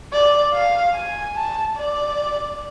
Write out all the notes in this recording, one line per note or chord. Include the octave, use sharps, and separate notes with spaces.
D5
F5
G#5
A5
D5